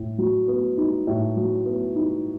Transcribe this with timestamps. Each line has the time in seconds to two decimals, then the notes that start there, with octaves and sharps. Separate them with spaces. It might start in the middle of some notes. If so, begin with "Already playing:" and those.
Already playing: A2
0.18 F#3
0.48 B3
0.78 D#4
1.07 A2
1.37 F#3
1.66 B3
1.95 D#4